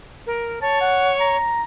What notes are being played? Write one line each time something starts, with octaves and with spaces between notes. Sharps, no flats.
A#4
C#5 A5
F#5
A#5